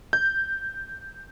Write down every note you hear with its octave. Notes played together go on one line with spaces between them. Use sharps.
G6